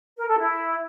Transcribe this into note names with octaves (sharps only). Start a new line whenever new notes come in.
A#4
A4
E4